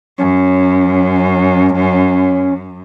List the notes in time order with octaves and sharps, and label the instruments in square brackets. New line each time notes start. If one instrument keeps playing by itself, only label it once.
[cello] F#2 [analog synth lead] C#4